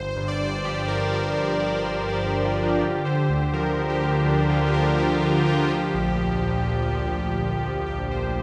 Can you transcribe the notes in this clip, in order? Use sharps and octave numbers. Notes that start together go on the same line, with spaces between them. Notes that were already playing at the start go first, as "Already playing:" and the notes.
Already playing: G1 C5
C5
G2
D5
G1
C5
F3 G4
F3 A#4
F3 C5
F3 C5
F3 D5
D5
G2 C5
F3 D5
C5
G2
F4
F3
D4
D3 G4
D3 C5
D2
F3 A#4
D3
G4
D2
D2 D4
D3 F4
G4
D2 A#4
D2 G4
D2 F4
D2 F4
F3 G4
A#1
A#1
A#2
A#1
F3
A#2
A#1
F3
A#1 G4
A#2 C5